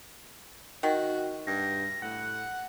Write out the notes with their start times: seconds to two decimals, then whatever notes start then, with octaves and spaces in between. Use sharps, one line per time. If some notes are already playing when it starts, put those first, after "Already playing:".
0.83 D#3 F#4
1.47 G2 A#6
2.02 A2 F#5